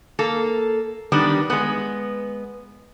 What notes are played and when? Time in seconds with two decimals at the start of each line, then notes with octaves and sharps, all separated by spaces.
0.19 A#3 A4
1.12 D#3 G3 B3 D4
1.50 G#3 B3